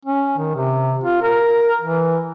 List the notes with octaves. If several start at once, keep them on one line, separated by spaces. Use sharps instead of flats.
C#4
D#3
C3
F4
A#4
E3